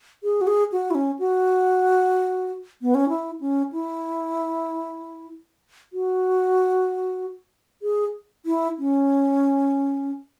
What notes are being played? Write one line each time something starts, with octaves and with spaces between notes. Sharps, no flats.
G#4
F#4
G#4
F#4
E4
C#4
F#4
B3
C#4
E4
C#4
E4
F#4
G#4
E4
C#4